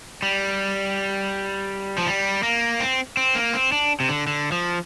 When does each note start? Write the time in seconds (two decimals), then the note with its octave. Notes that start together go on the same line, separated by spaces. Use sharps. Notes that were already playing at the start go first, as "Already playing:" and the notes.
0.23 G3
1.98 F3
2.06 G3
2.43 A#3
2.80 C4
3.17 C4
3.35 A#3
3.53 C4
3.72 D4
4.00 C3
4.09 D3
4.27 D3
4.52 F3